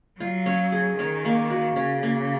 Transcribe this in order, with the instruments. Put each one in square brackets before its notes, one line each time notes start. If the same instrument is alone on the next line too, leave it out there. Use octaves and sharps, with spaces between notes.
[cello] F#3 [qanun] F4
[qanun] C#4
G#4
[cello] D#3 [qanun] C#4
[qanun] A#3
F#4
[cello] C#3 [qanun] C#4
[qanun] A#3